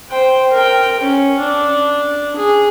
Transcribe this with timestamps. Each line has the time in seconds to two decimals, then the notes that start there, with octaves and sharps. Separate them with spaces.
0.10 C5 G5
0.52 A#4 G5
1.00 C#4
1.40 D4
2.36 G#4